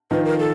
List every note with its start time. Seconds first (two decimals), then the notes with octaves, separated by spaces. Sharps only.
0.11 D#3 F3 B4
0.25 A#4
0.39 A4